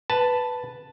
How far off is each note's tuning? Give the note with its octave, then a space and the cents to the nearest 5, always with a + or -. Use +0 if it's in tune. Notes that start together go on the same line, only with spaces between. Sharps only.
B4 +0 A5 +0